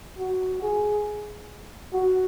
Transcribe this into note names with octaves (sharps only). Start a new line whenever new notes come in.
F#4
G#4
F#4